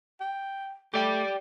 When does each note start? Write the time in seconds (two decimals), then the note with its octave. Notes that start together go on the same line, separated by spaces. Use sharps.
0.20 G5
0.94 A3 G4 D5 G5